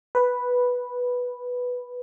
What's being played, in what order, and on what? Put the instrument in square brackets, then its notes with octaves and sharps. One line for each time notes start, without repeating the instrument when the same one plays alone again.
[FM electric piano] B4